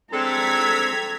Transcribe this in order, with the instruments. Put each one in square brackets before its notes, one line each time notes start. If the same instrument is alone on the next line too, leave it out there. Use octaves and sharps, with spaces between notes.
[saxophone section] G#3 D4 A4 [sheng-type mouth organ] C4 [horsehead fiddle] A#5 [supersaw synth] G#6 B6